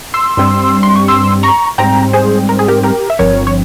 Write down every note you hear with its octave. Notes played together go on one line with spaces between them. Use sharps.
C6 E6
G2 G3 C4
C6
C#6
C6 E6
A#5 C#6
G#2 G3 C4 G5 A#5
G#4 C5
A#4
G#4
G4 A#4
G4 A#4
E5
G1 G2 F3 C4 A#4 C#5
C#5